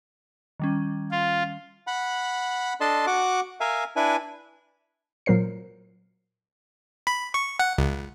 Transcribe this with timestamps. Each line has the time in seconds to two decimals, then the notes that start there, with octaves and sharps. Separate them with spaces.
0.60 D#3 G3 C#4
1.11 F4
1.87 F#5 B5
2.81 D4 A4 D#5 A5 C6
3.07 F#4 F#5 D6
3.61 A#4 E5 F5 G#5
3.96 D4 E4 B4 G#5
5.26 A#2 F#3 A#4 C5 C7
7.07 B5
7.34 C#6
7.59 F#5
7.78 C#2